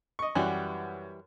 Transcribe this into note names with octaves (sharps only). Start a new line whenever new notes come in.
D#5 C#6
F#2 E3 G3 E4 F#4